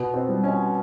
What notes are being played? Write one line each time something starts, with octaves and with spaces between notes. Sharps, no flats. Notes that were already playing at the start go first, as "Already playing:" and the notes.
Already playing: B2 B3
C4
G3
C#4